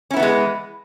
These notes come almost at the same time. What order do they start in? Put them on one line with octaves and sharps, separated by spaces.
C#4 E4 B3 E3 G#3